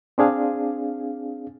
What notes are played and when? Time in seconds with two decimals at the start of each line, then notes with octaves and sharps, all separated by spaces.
0.18 C4 D4 G#4 F5